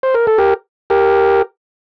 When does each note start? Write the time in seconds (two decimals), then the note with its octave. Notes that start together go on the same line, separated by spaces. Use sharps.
0.03 C5
0.14 A#4
0.27 A4
0.38 G4 A#4
0.90 G4 A#4